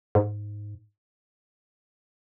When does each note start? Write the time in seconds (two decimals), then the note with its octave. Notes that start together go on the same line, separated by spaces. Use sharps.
0.15 G#2